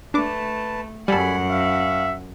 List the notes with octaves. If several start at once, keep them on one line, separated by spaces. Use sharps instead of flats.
A3 D4 B4 A5 D6
F#2 G3 A4 F#5 G#5 B5
E5 F5